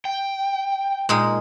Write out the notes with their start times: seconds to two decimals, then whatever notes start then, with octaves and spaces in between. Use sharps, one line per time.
0.05 G5
1.09 A#2 G#3 D#4